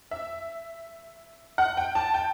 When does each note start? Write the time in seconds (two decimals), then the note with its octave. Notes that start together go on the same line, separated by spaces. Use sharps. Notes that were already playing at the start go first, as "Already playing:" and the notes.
0.11 E5
1.58 F#5
1.77 G5
1.95 A5
2.14 G5